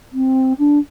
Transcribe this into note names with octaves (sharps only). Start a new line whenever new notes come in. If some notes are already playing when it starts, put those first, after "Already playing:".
C4
D4